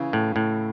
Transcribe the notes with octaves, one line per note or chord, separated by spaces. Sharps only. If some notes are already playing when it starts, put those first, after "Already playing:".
Already playing: C#3 E3
A2
A2